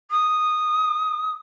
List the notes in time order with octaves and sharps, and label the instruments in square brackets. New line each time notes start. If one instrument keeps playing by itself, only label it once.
[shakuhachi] D#6